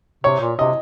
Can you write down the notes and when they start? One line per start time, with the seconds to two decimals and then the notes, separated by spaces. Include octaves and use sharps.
0.24 C3 C#5
0.41 A#2
0.59 C3 D#5